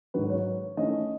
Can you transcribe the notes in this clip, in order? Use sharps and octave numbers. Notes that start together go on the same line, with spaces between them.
G#2 D#3 F#3 B4
C#5
D#3 A3 C#4 E4 D#5